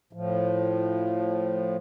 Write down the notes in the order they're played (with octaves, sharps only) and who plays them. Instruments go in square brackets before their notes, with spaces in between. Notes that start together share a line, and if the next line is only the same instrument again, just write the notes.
[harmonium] A2 F3